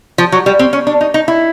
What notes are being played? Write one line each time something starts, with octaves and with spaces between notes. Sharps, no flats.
F3
F#3
G3
C4
C#4
D4
D#4
D#4
E4